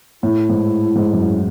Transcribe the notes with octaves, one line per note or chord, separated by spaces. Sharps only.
A2 E4
G#2
G#2
F#2